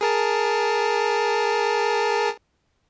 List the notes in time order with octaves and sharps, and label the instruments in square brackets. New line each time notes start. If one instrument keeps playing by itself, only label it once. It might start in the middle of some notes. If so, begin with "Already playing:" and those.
[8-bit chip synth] G#4 A#4 A5